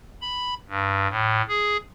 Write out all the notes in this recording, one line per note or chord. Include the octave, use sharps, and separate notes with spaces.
B5
G2
A2
G#4